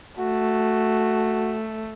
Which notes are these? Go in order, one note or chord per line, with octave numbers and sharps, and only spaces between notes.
A3 F#4